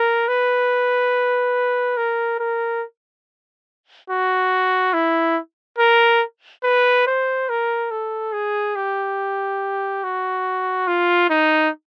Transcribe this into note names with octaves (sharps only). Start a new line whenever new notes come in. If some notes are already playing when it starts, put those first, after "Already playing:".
Already playing: A#4
B4
A#4
A#4
F#4
E4
A#4
B4
C5
A#4
A4
G#4
G4
F#4
F4
D#4